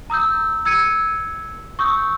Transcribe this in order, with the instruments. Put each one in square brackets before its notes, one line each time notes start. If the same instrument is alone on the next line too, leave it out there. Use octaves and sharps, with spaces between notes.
[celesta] A#5 D#6 E6 G6
E6 G#6 C#7 D#7
C#6 D#6 E6 G6